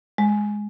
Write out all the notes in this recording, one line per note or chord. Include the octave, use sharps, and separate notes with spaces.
G#3